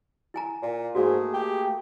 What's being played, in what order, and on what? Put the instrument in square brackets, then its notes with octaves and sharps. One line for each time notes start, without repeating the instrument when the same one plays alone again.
[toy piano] E4 G#5 A#5
[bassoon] A#2
[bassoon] G#2 [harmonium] A3 A#3 G#4 [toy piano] F#4
[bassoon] G4